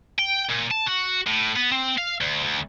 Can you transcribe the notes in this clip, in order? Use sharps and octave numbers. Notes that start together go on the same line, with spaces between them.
G5
A#2
A5
F#4
A2
B3
C4
F5
D2
D2